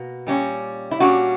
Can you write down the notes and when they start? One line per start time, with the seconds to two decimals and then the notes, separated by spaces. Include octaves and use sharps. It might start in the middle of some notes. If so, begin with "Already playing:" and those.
Already playing: B2 A#3
0.27 A#2 G3 C#4
0.91 E4
1.00 A#2 G3 C#4 D4 F#4